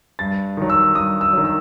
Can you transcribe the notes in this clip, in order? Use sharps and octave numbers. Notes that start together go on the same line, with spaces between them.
G2 A6
D#3 F#3
E6
G2 D#6
E6
D#3 F#3
E6